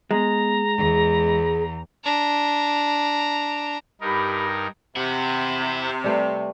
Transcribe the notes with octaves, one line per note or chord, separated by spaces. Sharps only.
G#3 B3 A#5
E2 G#4
D4 A#5
G2 D#4 G4 A#4 B5
C3 E4 F#5
G3 A3 B4